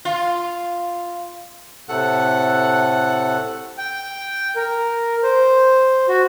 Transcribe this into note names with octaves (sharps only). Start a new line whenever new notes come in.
F4
A2 C3 A3 A4 F#5 F#6
G5
A#4
C5
F#4